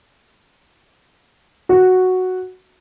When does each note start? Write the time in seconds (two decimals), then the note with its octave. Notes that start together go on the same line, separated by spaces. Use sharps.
1.69 F#4